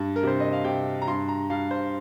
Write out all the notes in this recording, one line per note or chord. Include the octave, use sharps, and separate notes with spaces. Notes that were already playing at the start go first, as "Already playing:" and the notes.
Already playing: G2
A#4
C3 C5
D#5
F5
C3 G5
A#5
G2 C6
A#5
G2 F5
C5